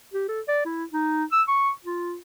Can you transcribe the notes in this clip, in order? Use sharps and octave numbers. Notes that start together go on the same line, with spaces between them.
G4
A4
D5
E4
D#4
E6
C#6
F4